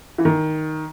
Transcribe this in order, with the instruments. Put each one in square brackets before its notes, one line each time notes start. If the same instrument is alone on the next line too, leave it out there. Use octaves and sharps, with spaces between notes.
[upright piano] E3
D#3